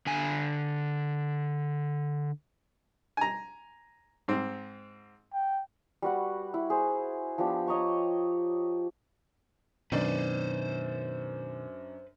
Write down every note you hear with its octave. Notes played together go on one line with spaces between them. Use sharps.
D3 G#5
G#5 A#5
G#2 C4
G5
G3 F#4 B4 F#5
E4
G#4 C5
F3 B3 D4 G4
C#5 D#5 A#5 C#6
F#2 B2 D#3 D4 B4 C5 D5